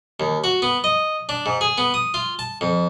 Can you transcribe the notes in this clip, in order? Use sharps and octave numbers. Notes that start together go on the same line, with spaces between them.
D#2
F#4
B3
D#5
D4
G#2
G#4
B3
D#6
F4
A5
F2